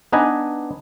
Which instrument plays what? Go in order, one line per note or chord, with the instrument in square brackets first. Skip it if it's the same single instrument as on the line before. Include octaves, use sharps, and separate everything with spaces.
[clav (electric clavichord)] B3 D4 D#4 B4 D#5 G#5